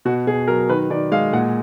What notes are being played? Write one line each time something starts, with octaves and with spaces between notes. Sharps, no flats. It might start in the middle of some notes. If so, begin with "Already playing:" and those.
B2 F#4
B2 G#4
F#3 A#4
D#3 B4
D#3 D5
G#3 F5
A#2 F#5